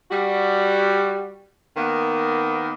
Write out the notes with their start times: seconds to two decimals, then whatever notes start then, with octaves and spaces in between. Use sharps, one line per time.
0.11 G3 F#4
1.77 D#3 A#3 B3